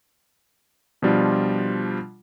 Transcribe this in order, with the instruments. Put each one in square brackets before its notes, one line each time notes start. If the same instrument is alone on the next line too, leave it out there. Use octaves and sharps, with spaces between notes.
[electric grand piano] B2 F3 G3 D4 F4